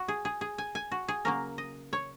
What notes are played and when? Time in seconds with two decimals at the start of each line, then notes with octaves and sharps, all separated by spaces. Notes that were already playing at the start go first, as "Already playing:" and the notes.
Already playing: F#4
0.08 G#4
0.25 G#4
0.41 G#4
0.58 G#5
0.75 G#5
0.92 F#4
1.08 G#4
1.25 C#3 F#3 A#3 A#4
1.58 D#5
1.93 C#5